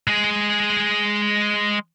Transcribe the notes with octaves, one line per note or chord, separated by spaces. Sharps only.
G#3 G#4